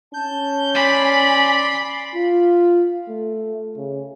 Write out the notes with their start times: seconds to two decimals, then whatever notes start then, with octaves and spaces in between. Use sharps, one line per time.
0.13 C#4 A5 G6
0.75 D5 G#5 B5 C6
2.15 F4
3.09 A3
3.77 C#3